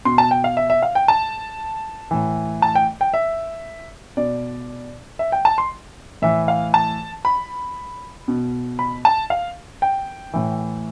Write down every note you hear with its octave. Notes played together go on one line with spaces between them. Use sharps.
B2 C6
A5
G5
F5
E5
E5
F5
G5
A5
A2 E3
A5
G5
G5
E5
B2 D5
E5
G5
A5
C6
A2 E3 E5
F5
A5
B5
B2
B5
A5
F5
G5
A2 E3